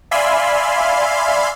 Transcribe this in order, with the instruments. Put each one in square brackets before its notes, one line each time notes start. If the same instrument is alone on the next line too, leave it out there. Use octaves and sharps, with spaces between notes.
[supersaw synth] D5 E5 F5 G#5 B5 C6